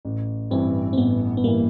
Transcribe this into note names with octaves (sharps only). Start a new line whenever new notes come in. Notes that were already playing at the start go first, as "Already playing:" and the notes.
A1
G2 E3 C4
C4
A1 B3
B3
G2 E3 A#3